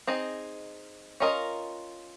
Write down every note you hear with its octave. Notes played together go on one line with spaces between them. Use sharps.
C4 D#4 G#4 D#5
C#4 F4 A#4 D#5